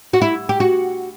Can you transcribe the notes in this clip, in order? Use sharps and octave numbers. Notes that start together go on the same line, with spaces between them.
F#4
E4
G4
F#4